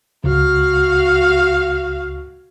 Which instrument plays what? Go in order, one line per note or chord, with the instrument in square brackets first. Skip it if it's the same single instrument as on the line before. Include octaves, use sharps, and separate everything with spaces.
[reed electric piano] C#2 [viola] F#4 F5